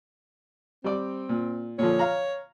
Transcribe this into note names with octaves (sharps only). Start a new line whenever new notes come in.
G3 C4 D5
A#2
A#2 D3 F3 C#5
F5 A#5